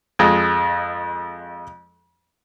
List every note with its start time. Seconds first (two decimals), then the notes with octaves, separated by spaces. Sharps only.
0.19 F2 G#3